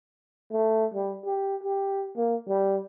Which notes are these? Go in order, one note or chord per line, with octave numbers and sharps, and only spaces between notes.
A3
G3
G4
G4
A#3
G3